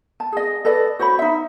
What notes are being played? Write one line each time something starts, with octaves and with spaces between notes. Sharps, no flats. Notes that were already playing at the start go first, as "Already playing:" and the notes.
A5
G#4 D#5
A4 B4 D5 D#5
F#4 C5 C#5 B5
D#4 E5